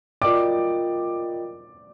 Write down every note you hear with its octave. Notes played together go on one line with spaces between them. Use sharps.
F4 A#4 D5 D#5 G5 D6